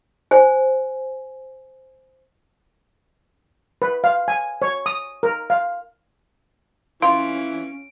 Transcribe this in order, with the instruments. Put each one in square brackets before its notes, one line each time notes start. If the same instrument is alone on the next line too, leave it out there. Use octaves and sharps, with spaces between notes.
[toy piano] C5 G#5
[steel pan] B4
F5
G#5
C#5
D#6
A#4
F5
[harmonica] E3 [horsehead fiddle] C#4 [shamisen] F4 [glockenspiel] D7